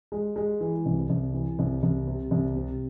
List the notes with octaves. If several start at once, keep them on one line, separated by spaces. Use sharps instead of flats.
G#3
G#3
E3
C2
C2
E3
C2
C2
C3
C2
C3